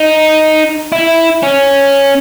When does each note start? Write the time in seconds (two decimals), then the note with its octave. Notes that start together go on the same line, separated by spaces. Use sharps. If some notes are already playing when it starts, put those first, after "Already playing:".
Already playing: D#4
0.92 E4
1.43 C#4